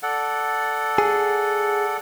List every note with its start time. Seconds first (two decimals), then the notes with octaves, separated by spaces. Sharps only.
0.03 A4 D5 F#5
0.98 G#4